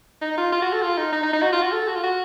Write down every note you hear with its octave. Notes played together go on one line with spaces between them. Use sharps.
D#4
F4
F4
F#4
A4
F4
D#4
D#4
D#4
D#4
F#4
F4
F#4
A4
F#4
F4
F#4